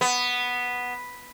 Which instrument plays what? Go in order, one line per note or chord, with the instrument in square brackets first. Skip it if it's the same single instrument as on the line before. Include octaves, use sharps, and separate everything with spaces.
[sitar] B3